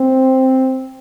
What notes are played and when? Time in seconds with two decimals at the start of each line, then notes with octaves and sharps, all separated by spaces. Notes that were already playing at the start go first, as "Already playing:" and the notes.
Already playing: C4